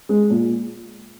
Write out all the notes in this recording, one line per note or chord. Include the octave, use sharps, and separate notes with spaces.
G#3
A#2